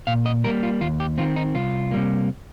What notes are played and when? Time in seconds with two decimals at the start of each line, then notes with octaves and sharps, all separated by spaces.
0.07 A#2 F5
0.26 D#5
0.44 G3 A#4
0.47 A#3
0.63 F4
0.81 D#2 F4
1.00 G4
1.18 D#3 C4 F4
1.36 D#4
1.54 C2 F4
1.91 C3 G3 A#3